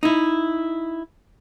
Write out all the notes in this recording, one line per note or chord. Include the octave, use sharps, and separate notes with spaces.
D#4 E4